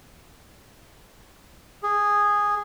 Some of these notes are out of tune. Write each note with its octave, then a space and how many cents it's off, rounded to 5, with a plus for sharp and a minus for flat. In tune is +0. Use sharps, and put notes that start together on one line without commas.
G#4 -10